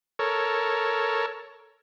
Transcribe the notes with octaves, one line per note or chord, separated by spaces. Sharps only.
A4 A#4 C#5